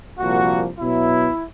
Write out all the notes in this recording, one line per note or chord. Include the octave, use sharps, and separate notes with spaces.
C2 A#2 F3 A#3 F#4
B2 F#3 B3 E4